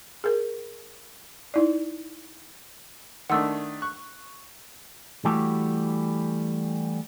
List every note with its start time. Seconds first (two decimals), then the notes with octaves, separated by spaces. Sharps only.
0.24 G#4 A#4
1.54 D#4 E4 D5
3.30 D#3 A3 D4 F#5 C6 E6
3.82 C#6 F#6
5.25 E3 G3 A3 F#4 G4